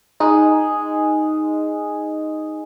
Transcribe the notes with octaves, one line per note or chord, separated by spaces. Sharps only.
G#3 D#4